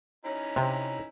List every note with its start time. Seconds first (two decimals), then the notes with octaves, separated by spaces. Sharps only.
0.25 C#4 D#4 E4
0.56 C3